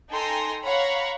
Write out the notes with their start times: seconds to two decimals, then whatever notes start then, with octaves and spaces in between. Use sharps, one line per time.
0.10 D#4 A4 G5 G#5 A#5 C6
0.63 C#5 F5 F#5 A#5 B5 C#6